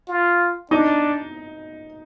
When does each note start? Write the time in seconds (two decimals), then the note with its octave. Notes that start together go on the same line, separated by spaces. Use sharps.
0.08 F4
0.71 D4 D#4